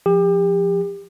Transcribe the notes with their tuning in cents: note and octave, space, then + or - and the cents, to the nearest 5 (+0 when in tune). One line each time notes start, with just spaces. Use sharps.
F3 +0 G4 +30